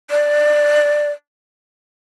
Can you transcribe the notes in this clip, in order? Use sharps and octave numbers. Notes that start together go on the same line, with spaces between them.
D5